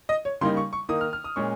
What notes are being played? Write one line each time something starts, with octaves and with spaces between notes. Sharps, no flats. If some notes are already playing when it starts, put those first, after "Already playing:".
D#5
C#5
C#3 G3 A#3 D#4 C6
C#6
C#6
D#3 A#3 D#4 D#6
F6
F6
D#6
A#2 G#3 C#4 C#6